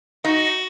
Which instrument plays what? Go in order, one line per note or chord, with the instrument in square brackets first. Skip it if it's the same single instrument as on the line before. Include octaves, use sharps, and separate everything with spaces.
[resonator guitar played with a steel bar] D#4 [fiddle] F#4